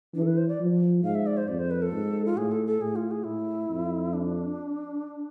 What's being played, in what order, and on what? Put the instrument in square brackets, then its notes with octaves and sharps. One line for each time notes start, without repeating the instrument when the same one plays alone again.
[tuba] E3 [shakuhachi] D4
[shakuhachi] A4
B4
C5
D5
[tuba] F3
[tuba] G#2 [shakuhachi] F5
[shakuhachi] E5
D5
C5
[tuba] F2 [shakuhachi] D5
[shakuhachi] C5
B4
A4
[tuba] G#2
[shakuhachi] F4
[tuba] A2 [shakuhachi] G#4
[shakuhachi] A4
A4
[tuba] A2 [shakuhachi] G#4
[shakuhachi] F4
G#4
[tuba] A2 [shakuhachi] E4
[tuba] F2
[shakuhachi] D4